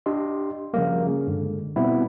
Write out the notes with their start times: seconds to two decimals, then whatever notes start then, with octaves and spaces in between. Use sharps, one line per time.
0.06 D4 G4 D#5 C6
0.74 C#3 F3 G3 A#3
1.07 C#3
1.27 G2 D3 G#3
1.76 B2 G3 B3 C4 E4